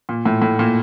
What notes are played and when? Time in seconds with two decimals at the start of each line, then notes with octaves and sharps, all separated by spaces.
0.09 A#2
0.26 A2
0.42 A2
0.59 A#2